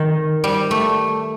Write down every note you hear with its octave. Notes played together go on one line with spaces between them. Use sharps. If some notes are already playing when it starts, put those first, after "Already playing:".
Already playing: D#3
G3
A3